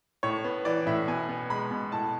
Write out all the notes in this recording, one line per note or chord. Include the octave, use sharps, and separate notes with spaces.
A2 C#5
B3
E3 D5
A2 E5
B2 G#5
B3
G#3 B5
B2
A2 A5